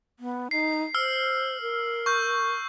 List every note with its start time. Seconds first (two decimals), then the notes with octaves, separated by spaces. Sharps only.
0.20 B3
0.51 D#4 C7
0.94 C5 E6 F6
1.62 A#4
2.06 C#6 G6